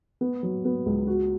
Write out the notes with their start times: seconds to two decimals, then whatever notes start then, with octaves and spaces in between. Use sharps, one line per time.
0.21 B3
0.43 F#3
0.65 B3
0.86 C#2
1.07 F#4